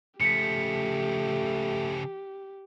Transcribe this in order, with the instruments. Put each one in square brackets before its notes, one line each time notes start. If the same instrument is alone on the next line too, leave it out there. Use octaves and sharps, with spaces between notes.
[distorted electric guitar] C#3 F3 [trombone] A3 [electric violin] G4 [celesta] B6 C#7